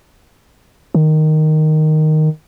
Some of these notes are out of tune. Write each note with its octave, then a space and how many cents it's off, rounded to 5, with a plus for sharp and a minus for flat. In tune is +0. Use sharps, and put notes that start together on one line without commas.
D#3 -5